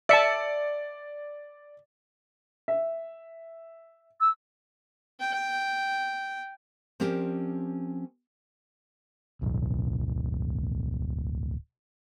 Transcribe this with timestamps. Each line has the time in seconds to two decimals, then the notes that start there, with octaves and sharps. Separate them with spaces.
0.09 D5 E5 A5 C#7
2.68 E5
4.20 E6
5.20 G5
7.00 F3 C4 C#4 G4 A#4 D5
9.41 D1 B1